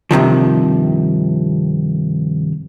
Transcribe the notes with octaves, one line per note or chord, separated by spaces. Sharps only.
G2 C3 D#3 F3